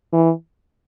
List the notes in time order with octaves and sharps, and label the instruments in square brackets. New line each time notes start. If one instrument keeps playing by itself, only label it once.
[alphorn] E3